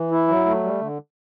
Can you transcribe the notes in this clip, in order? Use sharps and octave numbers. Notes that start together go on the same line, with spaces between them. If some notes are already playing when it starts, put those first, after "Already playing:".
Already playing: E3
E4
F#3
A3
G3
D3